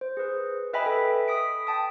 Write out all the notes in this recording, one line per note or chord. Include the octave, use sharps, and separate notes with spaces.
C5
G#4 B4
B4 D#5 E5 G5 G#5 B5
A4
D#6 B6 D7
G5 A5 D#6